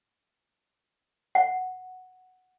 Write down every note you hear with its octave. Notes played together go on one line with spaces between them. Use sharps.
F#5